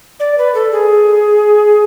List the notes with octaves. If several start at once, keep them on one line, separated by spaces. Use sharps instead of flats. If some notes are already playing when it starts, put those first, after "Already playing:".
D5
B4
A4
G#4